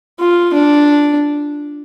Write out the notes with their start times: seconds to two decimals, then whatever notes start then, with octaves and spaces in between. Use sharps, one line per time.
0.19 F4
0.54 D4